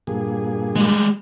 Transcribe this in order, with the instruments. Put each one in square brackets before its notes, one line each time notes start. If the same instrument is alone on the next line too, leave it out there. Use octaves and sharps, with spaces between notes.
[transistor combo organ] G2 A#2 G#4
[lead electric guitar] G3 G#3